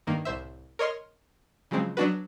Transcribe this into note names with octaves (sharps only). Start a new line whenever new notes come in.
G2 D#3 A#3
C2 A2 C5 E5
A#4 C#5 D#5 C6 F6
C#3 F3 F#3 G#3 C4
F#3 B3 D4 F#4 B4